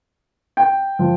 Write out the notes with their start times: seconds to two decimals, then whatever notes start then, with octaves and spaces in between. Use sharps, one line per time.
0.57 G5
0.99 F3